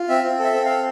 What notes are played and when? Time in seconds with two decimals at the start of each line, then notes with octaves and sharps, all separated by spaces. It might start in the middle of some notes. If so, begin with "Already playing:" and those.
Already playing: F4
0.09 C4 E5
0.24 C4
0.39 A4 E5
0.54 C4
0.65 F5
0.70 A4